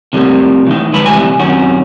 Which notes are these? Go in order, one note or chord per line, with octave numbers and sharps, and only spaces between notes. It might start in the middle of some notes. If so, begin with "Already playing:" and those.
C3 F3 G3 A3 A#3
A2 E3 D#4
D2 F3 G#3 B4 B5
A2 C3 E3 G3 G#5
F#2 C3 D#3 C#4 F#4